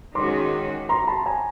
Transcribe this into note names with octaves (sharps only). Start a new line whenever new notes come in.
D#3 G#3 C#4 F#4 C6 D6
A#5 C6
A5 B5
G#5 A#5